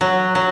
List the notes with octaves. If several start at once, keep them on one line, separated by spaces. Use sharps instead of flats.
F#3
F#3